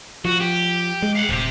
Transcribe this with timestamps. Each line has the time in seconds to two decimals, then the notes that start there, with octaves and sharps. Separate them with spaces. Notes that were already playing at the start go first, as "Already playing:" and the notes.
0.25 F3 F#4
0.40 G4
1.02 G#3
1.15 F5 F#5
1.29 D1 C3 G4